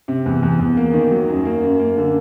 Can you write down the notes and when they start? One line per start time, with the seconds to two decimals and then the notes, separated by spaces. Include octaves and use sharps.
0.08 C3
0.26 E2
0.43 E2
0.59 E2
0.77 A#3
0.93 D#3
1.11 F#3
1.29 F#2
1.45 A#3
1.63 F#2
1.80 A#3
1.97 D3